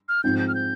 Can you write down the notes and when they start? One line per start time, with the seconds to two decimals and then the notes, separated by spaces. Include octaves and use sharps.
0.09 F6
0.24 G#2 F3 C4 G6
0.39 G6
0.48 F6
0.55 G6